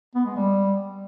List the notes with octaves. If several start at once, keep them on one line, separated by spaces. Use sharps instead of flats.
B3
G#3
G3